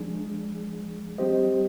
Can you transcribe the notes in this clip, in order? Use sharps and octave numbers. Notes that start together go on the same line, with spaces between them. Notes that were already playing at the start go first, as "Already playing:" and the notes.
Already playing: F3 G#3 D4 G#4
G3 C4 G4 C5 D#5